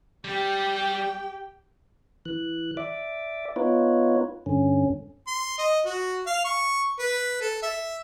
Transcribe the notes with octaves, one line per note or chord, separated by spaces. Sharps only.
G3 G4 G5
E3 F#6
D5 E5 D6
B3 D#4 F4 B4 C#5
G2 D3 C#4
C6
D#5
F#4
F5
C#6
B4
A4
E5